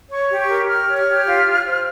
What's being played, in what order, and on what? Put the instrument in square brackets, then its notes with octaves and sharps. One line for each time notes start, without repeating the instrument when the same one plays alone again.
[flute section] C#5 C#6
G4
C#6
A#4
G4 F6
C#5
F6
G4
F4
F4
C5